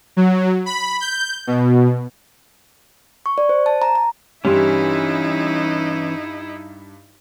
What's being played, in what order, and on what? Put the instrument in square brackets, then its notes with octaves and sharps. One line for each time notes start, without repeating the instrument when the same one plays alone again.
[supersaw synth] F#3
B5
G6
B2
[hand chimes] C#6
D5
C5
A5
A#5
A#5
[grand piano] G2 G3 C6 [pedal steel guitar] E3 C#4 [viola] D#4 E4 [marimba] G4